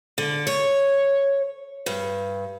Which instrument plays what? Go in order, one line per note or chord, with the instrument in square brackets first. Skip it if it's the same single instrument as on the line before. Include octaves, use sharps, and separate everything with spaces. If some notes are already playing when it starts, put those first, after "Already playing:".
[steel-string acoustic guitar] D3
C#5
G2